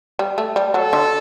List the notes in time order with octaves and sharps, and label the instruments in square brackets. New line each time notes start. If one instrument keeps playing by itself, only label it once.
[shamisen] G3
A3
G3
[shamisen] F#3 [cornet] A4
[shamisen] D3